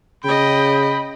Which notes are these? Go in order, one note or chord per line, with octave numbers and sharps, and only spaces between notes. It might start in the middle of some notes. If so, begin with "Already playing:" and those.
C#3 D#5 G5 B5